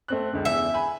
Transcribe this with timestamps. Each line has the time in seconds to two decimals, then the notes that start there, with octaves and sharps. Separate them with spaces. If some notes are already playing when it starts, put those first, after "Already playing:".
0.08 A3 C4 F#6
0.33 C#2 D3
0.45 E2 E5
0.74 G#5 B5